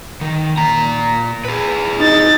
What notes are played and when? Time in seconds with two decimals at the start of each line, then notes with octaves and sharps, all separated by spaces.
0.21 D#3
0.57 A#2 A#5
1.45 G#4 B4
1.99 D#4 A6